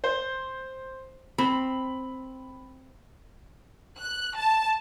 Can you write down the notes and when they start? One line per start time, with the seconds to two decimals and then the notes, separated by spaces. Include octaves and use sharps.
0.04 C5
1.38 C4 B5
3.98 F#6
4.36 A5